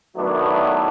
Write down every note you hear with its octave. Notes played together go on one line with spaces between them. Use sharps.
D#3 F#3 A3 B3 D4 E4